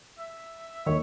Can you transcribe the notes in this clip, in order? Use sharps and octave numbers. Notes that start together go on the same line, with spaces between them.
E5
D#2 D#3 C#5